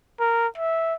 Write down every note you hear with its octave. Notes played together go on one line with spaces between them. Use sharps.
A#4
E5